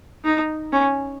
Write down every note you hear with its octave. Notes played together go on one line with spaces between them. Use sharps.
D#4
C#4